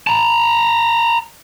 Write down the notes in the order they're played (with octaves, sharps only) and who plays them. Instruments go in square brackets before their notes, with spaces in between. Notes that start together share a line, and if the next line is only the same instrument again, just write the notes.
[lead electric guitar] A5 A#5